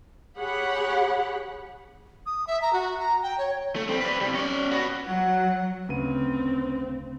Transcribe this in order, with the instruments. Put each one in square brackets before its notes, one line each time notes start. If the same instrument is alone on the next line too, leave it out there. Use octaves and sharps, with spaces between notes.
[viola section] G4 G#4 C#5 F#5 B5
[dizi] D#6
E5
A#5
F#4
A#5
G5
C#5
[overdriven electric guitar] A3
G3 C4
B4 D5
C3 G3
C#4 D5
B3 F#4
[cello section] F#3 [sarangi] F#5
[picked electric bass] D2 [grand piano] C#3 B4 D#7 [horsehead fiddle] C4